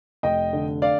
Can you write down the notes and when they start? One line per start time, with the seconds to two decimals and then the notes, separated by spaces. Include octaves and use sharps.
0.23 F1 D#5 G5
0.53 D3
0.82 D5 F5